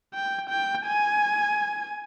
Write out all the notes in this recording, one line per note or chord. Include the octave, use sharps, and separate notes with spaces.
G5
G5
G#5